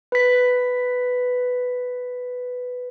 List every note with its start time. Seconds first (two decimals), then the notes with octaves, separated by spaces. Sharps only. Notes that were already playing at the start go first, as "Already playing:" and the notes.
0.12 B4 B6